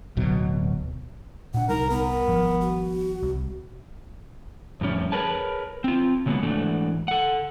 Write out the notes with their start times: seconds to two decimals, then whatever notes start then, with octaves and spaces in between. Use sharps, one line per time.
0.17 D1 B2 F#3
1.54 A#2 D4 F#5
1.69 C2 G3 D#4 A#4
1.90 B3 A#4
2.28 G#1 F3 G3
2.61 F#4
3.23 C2
4.81 F2 A2 G3 C#4 E4
5.12 G#4 A#4 B4 C#5 A5
5.84 C4 F4
6.26 C#3 F#3 G#3 A#3 B3
6.42 G#2 E3 A3 D4 F#4
7.08 A4 F#5